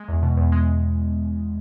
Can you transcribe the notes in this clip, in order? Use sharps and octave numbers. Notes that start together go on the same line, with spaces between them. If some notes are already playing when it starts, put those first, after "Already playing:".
Already playing: G#3
E2
B2
E2
G#3